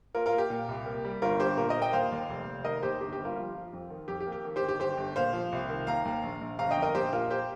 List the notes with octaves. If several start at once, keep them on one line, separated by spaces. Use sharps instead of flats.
A#3 F4 A#4
F4 A#4
A#3
G4
A#2
C2
A#3
G3
G1 F4 A#4
G2 G4 C5
A#2 F4 A#4
A#4 D#5
A#3
D#5 G5
D#2 C5 F5
D#2
F1
F1
D#3 A#4 D#5
D#2 G4 C5
G1 G4
G4
G3
F4 A#4
F3 F4
F3
F2
D#3
F2 G4
G4
A#3
G4
D#3
G4 C5
G1
G4
G1 G4 C5
G1
A#2 C5 F5
F3
C2
D#3
D#2 F5 A#5
D#2
A#1
A#1
G1 F5 A#5
D#5 G5
F2
A#4 D#5
A#1 G4 C5
A#2 F4 A#4
G4 C5